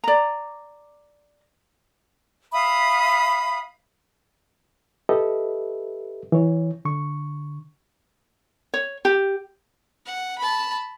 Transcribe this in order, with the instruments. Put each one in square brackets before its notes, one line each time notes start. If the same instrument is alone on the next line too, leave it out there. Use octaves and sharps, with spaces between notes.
[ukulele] D5 A#5
[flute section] E5 F5 B5 D#6
[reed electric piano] G4 A4 B4 D#5 E5
E3 C#5
D3 C#6
[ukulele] C#5
G4
[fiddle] F#5
A5 B5